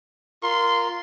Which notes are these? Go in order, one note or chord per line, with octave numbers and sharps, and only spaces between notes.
F4 A#4 C6